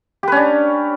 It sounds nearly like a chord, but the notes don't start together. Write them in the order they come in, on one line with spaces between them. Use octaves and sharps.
G4 B4 C#4 D4